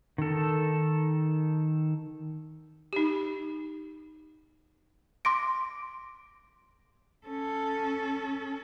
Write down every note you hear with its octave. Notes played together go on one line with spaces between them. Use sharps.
D#3 A4
D#4 G4
C6 D6 A#6 D7
C#4 A4